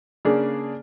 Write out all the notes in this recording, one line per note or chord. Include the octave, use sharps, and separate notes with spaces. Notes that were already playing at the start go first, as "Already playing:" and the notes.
C#3 A#3 D4 G#4